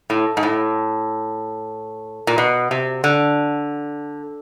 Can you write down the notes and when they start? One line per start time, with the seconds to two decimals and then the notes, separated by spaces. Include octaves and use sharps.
0.10 A2
0.37 G#2
0.43 A2
2.27 A#2
2.38 B2
2.71 C3
3.04 D3